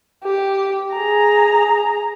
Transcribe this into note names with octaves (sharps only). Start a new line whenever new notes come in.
G4
G#4 A#5